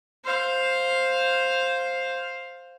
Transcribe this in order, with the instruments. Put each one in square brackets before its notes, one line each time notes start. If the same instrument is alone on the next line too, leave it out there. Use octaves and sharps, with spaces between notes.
[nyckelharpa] C5 F5